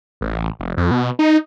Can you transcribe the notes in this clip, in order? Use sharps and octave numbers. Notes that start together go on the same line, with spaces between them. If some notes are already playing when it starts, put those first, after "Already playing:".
A1
F1
F2
B2
D#4